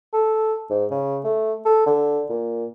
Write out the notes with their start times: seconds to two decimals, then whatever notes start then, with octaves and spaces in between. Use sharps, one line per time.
0.13 A4
0.70 G#2
0.91 C#3
1.24 A3
1.65 A4
1.86 D3
2.29 A#2